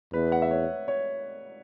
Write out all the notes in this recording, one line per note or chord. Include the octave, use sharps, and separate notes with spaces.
E2 B4
F#5
E5
C#5
C#5